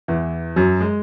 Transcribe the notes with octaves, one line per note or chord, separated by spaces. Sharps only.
E2 E3
F#2 F#3
G#3